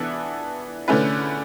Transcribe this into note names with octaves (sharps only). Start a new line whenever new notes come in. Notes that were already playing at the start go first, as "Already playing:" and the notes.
Already playing: E3 B3 D4 A4 E5
D3 A3 C#4 E4 B4